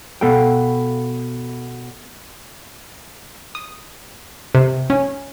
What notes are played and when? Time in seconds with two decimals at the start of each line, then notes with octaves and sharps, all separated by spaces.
0.21 B2 B3 A4 F5 G5
3.55 D#6
4.55 C3
4.90 C#4